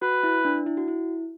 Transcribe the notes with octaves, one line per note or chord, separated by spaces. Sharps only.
F#4 B4
E4
D4
E4
F#4
E4